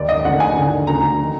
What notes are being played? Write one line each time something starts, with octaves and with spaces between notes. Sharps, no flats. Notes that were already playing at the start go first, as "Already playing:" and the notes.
Already playing: D#2 D#3 D5
D#5
D2 D3 F#5
G#5
D#2 D3
D2 D3 A#5
D#3